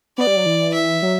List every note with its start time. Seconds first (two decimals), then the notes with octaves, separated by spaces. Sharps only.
0.18 B3 D5
0.27 G3
0.37 F#3
0.46 E3
0.74 E5
1.02 F#3